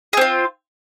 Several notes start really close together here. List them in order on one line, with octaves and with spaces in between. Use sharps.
G#4 C4 F4